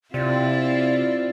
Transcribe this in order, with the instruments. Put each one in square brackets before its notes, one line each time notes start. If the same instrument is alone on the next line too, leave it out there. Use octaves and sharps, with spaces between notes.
[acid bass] C3 [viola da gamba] C4 E4 F4 [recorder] D5